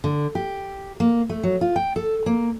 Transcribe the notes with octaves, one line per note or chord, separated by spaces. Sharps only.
D3
G4
A#3
A3
F#3
F4
G5
A4
A#3